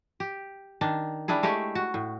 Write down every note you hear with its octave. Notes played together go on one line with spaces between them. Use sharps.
G4
D#3 D4
G3 D4 E4 G#4
G#3 A3 G4 C#5
F#4
A2